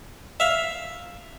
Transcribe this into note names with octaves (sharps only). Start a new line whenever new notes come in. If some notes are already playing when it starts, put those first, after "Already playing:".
E5 F5